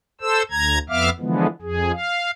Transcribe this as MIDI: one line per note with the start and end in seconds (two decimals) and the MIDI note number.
0.21 0.42 69
0.21 0.42 72
0.21 0.42 88
0.51 0.78 38
0.51 0.78 82
0.51 0.78 92
0.89 1.09 41
0.89 1.09 59
0.89 1.09 76
0.89 1.09 77
0.89 1.09 86
0.89 1.09 89
1.20 1.46 50
1.20 1.46 52
1.20 1.46 53
1.20 1.46 56
1.20 1.46 59
1.62 1.92 41
1.62 1.92 68
1.92 2.31 77